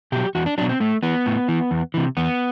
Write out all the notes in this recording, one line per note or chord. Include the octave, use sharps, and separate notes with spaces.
B2 F#3 G4
E2 F#4
D4
B2 F#3 D4
C4
A2 A3
E3 B3
A2
E3
E2
C3 E3
E2 B3